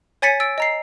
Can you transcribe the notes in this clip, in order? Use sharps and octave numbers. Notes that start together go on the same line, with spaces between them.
C#5 G#5 A6 B6 C#7 D#7
E6 A6 D7
D#5 A#5 C7